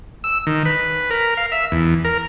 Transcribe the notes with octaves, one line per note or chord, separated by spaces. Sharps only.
E6
D#3
B4
A#4
F5
E5
E2
A#4